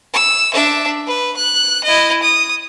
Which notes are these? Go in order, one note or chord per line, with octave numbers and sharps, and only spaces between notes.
E6
D4 E5
B4
F#6
E4 D#5
D#6